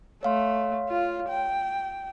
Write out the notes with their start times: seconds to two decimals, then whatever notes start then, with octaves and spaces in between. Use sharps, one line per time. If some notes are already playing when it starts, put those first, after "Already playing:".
0.23 A3 C#5 F5 C6
0.89 F4
1.29 G5